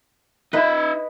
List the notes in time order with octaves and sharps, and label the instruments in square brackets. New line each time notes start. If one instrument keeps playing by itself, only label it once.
[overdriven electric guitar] D#4 E5 [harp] B4 D#5